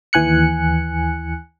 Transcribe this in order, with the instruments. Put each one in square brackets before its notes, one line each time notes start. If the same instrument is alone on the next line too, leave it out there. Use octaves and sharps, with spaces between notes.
[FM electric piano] D#2 E3 G#5 F#6 C#7